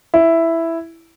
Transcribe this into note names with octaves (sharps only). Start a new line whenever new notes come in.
E4